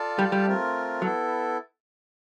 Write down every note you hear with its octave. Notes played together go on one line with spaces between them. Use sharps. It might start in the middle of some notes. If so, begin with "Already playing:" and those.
Already playing: F4 A4 D5 F5 A5
G3
G3
A3 C4 F4 A#4
F#3 B3 E4 A4